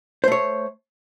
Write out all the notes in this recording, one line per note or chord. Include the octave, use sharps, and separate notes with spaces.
A3 C5 C#5